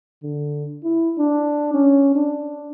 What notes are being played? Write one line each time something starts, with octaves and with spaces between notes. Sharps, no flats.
D3
E4
D4
C#4
D4